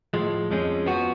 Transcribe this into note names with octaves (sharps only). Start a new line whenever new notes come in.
A2 F3 G#3
F2 F3 G#3 C#4
F3 B3 F#4